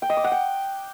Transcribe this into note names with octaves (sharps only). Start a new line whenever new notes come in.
G5
D#5
D6
F#5
G5